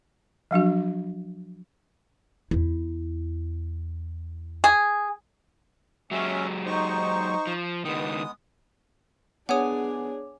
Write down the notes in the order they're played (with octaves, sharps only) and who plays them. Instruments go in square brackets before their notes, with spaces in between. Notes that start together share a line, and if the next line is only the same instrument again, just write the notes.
[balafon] F3 F#3 D4 F#4
[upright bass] E2 E4
[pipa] G#4
[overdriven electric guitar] F#3 G#3 [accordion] C#4 E5
[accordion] D#4 C5 C#6
[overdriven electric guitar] F3
[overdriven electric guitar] C#2 D#3 [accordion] G#3 B3 D#6
[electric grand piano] B3 [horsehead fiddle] D4 G#4 [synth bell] C#5 G#5 D6 [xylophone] F#5 D#6